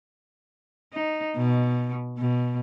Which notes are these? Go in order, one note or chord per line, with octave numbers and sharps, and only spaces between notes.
D#4
B2
B2